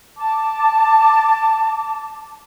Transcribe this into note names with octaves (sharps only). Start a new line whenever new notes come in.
A5 D6